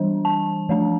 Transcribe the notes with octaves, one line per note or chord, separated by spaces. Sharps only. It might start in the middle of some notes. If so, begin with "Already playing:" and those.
Already playing: E3 G3 D4
A5
F3 A3 D4